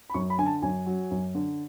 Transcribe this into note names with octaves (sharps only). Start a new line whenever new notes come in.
B5
F#2 C#6
B5
D3 G#5
A5
F#2 G#5
F#3
F#2
D3